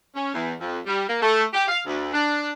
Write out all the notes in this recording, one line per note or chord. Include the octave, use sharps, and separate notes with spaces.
C#4
E2
F2
G3
A#3
A3
G4
F5
D2
D4